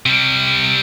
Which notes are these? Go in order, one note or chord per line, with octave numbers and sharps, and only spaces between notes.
C3 G3